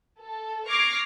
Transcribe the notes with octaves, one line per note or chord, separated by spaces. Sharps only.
A4
C#6 D6 F6 G#6 A#6 C7